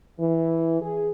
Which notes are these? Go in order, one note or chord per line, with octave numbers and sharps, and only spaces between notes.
E3
G#4